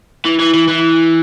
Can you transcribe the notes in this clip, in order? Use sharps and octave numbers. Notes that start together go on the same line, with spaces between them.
E3
E3
E3
E3